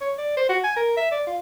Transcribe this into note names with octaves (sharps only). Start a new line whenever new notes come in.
C#5
D5
C5
F#4
G#5
A#4
E5
D5
F4